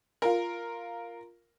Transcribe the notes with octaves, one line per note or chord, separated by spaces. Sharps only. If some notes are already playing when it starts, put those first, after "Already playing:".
F4 A#4